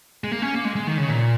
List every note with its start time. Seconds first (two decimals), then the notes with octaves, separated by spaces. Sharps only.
0.24 G#3
0.32 A#3
0.42 C#4
0.54 A#3
0.65 G#3
0.76 G#3
0.87 D#3
0.98 C#3
1.09 A#2